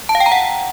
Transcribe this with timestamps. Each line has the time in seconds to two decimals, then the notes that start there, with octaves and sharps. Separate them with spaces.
0.09 A5
0.15 F5
0.20 G5
0.26 A#5
0.32 F#5